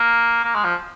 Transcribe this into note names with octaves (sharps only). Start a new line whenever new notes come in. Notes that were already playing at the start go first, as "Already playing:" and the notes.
Already playing: A#3
A#3
G#3
F3